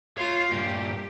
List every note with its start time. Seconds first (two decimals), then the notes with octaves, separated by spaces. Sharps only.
0.18 F4 C#5 F5 C6
0.51 G2 A#2 G4